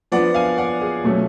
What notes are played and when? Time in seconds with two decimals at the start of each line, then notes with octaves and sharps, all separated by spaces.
0.12 F3 B3 D4 D5 F#5
0.34 F5 G#5
0.57 D5 F#5
0.81 G#4
1.04 B2 F#3 A3 C#4